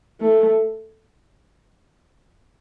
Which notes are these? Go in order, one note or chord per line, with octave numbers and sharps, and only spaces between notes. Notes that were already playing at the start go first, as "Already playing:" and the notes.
A3